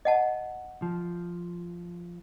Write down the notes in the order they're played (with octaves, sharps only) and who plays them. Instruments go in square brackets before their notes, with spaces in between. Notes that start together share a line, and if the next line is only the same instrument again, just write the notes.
[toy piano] D#5 F#5 A5
[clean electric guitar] F3